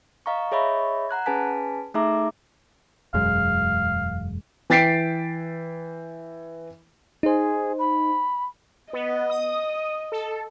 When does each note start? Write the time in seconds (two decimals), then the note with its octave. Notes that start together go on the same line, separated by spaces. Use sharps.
0.26 D#5 F5 A#5 C#6
0.52 G#4 C#5 D#5 E5 B5 C#6
1.09 F#5 A#5 F#6 G#6
1.26 C#4 G#4 B4 G#5 A5 B6
1.94 A3 D#4 G#4 E5 A#5 D6
3.14 E1 F#2 G#3 F5
4.70 E3 G5 A6 B6 C7 D7
7.23 D#4 G#4 C5
7.79 B5
8.93 B3 D#5
9.30 D#6
10.12 A4